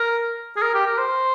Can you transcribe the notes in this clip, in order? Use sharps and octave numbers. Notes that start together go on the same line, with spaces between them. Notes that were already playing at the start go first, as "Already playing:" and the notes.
Already playing: A#4
G#4
A#4
G4
A#4
C5